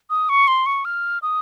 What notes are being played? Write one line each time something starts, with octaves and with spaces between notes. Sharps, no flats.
D#6
C#6
C6
C#6
F6
D#6